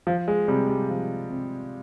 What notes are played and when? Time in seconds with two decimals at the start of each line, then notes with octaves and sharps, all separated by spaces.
0.07 F3
0.28 G#3
0.48 C3 G3
0.68 G3
0.89 F3
1.30 C3